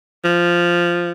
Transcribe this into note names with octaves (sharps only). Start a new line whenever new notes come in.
F3